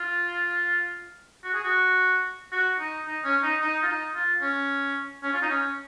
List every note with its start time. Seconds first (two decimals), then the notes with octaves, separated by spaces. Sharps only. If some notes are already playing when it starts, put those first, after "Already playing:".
Already playing: F4
1.44 F#4
1.54 G#4
1.64 F#4
2.52 F#4
2.79 D#4
3.06 D#4
3.24 C#4
3.42 D#4
3.61 D#4
3.82 F4
3.87 D#4
4.14 F4
4.41 C#4
5.23 C#4
5.33 F4
5.42 D#4
5.50 C#4